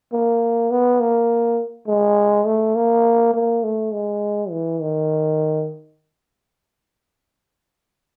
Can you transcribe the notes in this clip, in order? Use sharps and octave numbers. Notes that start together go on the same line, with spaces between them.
A#3
B3
A#3
G#3
A3
A#3
A#3
A3
G#3
E3
D#3